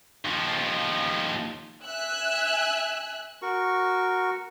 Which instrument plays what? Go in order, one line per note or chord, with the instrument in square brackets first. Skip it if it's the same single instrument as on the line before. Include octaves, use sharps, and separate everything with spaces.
[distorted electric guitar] D#2 F3
[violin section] E5 G#5 E6 F#6
[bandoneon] F#4 A#4 C#6